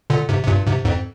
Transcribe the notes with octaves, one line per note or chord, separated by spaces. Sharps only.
A#2 D3
G#2 C3
C3
G2 A#2
G#2 C3
F2 G#2